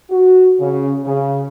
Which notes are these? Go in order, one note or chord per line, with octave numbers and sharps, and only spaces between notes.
F#4
C#3
C#3